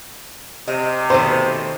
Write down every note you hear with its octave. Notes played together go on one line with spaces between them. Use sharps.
C3 D#5
B2 D#3 A3 C5